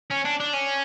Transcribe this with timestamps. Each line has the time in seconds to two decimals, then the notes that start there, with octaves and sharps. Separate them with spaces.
0.10 C#4
0.25 D4
0.40 D4
0.53 C#4